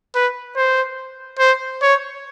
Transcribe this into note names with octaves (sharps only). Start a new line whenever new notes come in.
B4
C5
C5
C#5